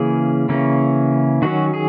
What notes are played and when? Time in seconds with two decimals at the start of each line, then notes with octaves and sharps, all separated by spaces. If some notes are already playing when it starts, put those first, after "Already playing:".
Already playing: C#3 E3 A#3 C#4 G#4
0.49 C#3 E3 A#3 C#4
1.42 D#3 F#3 C#4 F#4
1.74 G#4